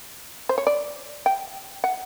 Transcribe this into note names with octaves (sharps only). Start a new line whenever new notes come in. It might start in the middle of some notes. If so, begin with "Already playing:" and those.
C5
C#5
D5
G5
F#5